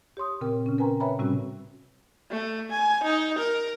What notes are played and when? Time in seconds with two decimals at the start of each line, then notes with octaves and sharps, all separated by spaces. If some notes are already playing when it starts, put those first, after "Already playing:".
0.17 G4 C#5 C6 D#6
0.41 A#2 C#3 C4 A#4 G5
0.66 C#3 C#4
0.78 A#4 B4 G5 G#5 A#5 C6
1.00 B4 C#5 E5 G5 A#5 B5
1.19 A2 C3 G3 C4 C#4 F#4
2.31 A3
2.71 G#5
3.04 D#4
3.38 A#4